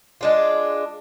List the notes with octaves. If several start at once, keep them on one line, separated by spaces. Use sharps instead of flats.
G#3 D4 F4